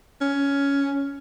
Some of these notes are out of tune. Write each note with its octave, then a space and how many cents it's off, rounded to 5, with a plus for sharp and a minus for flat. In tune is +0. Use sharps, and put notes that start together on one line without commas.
C#4 +10